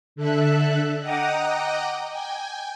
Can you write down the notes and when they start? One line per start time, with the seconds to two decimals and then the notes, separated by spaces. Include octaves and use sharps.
0.16 D3 A4 E5 F#6
1.00 D#5 F#5 G5 A#5 D6 D#6
2.10 G5 G#5